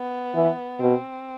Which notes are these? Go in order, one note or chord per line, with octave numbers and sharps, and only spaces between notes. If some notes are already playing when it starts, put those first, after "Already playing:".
Already playing: B3
E3
B2 C4